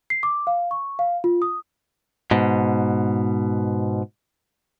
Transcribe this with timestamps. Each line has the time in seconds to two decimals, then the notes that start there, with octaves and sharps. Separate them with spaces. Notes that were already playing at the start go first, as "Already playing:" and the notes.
0.10 C7
0.23 D6
0.47 F5
0.71 C#6
0.99 F5
1.24 F4
1.42 D#6
2.31 G#2 B2